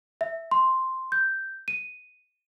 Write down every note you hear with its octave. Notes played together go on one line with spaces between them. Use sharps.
E5
C6
G6
D#7